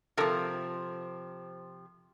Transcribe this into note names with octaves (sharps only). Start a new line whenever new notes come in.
C3 F3 A4 A#4 E5